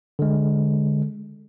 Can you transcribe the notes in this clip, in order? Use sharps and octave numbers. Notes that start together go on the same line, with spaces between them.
D3 G#3